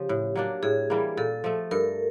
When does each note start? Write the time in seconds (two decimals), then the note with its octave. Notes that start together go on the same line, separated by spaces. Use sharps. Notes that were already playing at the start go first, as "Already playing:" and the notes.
Already playing: C#3 F3 G4
0.09 A2
0.35 F#3 A#3 D4
0.63 A2 G#4
0.90 E3 G3 A#3
1.17 A#2 A4
1.44 F3 A3
1.71 G2 A#4